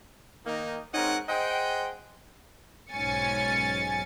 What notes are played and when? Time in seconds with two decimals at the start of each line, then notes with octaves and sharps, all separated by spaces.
0.46 D#3 A#3 D#4
0.94 G#2 C4 C#4 D#4 A#4 F#5
1.29 G#4 C5 D#5 F#5 G5
2.91 B1 G#2 C#4 G#5 A6 C#7